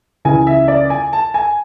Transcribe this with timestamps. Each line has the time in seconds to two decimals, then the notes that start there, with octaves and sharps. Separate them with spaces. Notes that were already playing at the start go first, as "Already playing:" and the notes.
0.25 C#2 C#3 E3 G#5
0.47 E5
0.68 D5
0.90 G#5
1.13 A5
1.34 G#5